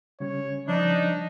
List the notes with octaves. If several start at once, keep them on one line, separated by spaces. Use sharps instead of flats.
C#3 G3 C#4 C#5
F3 D4 D#4